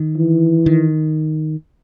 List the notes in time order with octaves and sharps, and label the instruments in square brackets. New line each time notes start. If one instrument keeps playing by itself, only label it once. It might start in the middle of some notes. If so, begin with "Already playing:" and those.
Already playing: [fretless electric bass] D#3
[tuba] E3
[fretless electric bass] D#3